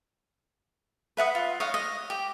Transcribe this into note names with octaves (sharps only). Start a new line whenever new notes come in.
B4 E5 F#5 D#6
F4
C#5 D#5 F5 F#5
D#5
G4